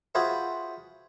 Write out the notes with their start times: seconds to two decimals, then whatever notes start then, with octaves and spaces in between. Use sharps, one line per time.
0.15 F4 F#4 G#4 B4 C5 E5